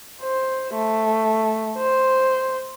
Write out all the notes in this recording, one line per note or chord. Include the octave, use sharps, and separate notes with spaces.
C5
A3
C5